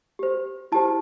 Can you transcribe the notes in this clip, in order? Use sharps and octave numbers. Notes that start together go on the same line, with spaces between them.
G4 C5
E4 G4 C5 A5